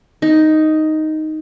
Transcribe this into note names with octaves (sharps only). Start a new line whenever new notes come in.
D#4